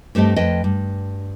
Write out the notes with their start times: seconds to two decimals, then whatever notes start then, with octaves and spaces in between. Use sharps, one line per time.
0.15 G2 A3 C4 G4 D#5
0.36 F2 B4 D#5 G5
0.64 G2